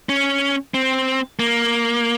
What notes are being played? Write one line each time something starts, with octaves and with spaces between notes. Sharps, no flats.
C#4
C4
A#3